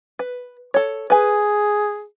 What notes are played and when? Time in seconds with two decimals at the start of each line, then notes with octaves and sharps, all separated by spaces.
0.19 B4
0.74 A4 C#5
1.10 G#4 B4 G#5